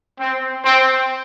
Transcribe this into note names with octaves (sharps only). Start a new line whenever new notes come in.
C4
C4